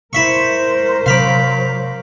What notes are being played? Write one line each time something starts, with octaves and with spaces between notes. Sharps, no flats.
E4 A#4 C5 E5 C#6
C3 F#3 F5 B5 D6